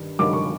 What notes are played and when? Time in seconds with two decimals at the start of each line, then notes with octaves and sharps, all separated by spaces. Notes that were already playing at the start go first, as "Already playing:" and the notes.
Already playing: G2 D#3
0.19 G2 D#3 F#3 D6
0.33 C#6